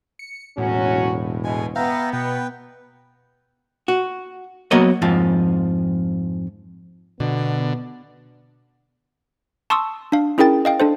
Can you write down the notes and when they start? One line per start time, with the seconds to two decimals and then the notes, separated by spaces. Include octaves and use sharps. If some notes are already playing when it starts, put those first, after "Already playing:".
0.19 C#7
0.58 E1 A2 F#3 C#4 F#4
1.44 B2 G#3 G#5
1.76 B3 E5 F5 G5 A#5
2.13 B2 B4 G5
3.88 F#4
4.71 F#3 A#3 B3 C#5 D#5
5.02 F2 G#2 F3
7.20 B2 D3 B3
9.70 A5 C6 C#6 D#6 E6
10.12 D4 F5
10.38 C#4 E4 G#4 A#4 G5 A6
10.65 D#5 F5 G5
10.80 D4 A4 C5